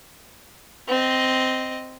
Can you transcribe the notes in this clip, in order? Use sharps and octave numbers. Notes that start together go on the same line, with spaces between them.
C4 D#5